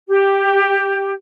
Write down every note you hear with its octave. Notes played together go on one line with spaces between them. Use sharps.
G4